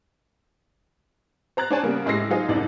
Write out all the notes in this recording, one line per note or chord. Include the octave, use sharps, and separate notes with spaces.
C5 A#5 F#6 A6
D4 C5 C#5 G#5 A5
C#3 G3 A#3 B3
A2 G#3 G4 E6 A#6 C7
F#3 D#4 F4 G#4 C5 D#5
F#1 C2 C3 D#4 D5